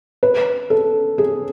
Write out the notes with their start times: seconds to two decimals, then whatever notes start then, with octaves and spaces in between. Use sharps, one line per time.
0.23 B4
0.70 A4
1.18 G#4